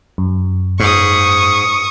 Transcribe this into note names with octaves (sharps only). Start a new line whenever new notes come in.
F#2
G#2 C#6 D#6